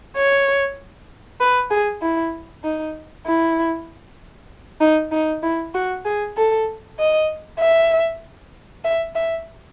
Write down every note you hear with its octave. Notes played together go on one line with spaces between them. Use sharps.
C#5
B4
G#4
E4
D#4
E4
D#4
D#4
E4
F#4
G#4
A4
D#5
E5
E5
E5